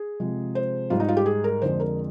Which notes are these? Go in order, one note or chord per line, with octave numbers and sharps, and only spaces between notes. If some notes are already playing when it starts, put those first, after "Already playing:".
Already playing: G#4
C3 F3 G#3
C5
G#2 G3 F4
D#4
F4
G4
G#4
A#4
F2 D3 G#3 C5
A#4